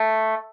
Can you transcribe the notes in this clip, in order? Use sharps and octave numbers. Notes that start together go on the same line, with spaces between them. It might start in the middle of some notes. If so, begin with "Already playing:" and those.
Already playing: A3